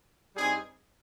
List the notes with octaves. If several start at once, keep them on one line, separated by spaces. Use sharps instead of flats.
G2 G3 C4 D#4 G#4